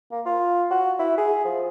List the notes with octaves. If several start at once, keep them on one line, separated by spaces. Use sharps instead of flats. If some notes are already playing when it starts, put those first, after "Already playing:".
A#3
F4
F#4
E4
G#4
F3